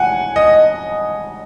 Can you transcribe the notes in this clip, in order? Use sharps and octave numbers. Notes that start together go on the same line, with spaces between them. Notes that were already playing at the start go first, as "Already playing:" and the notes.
Already playing: F#5 G#5
D#5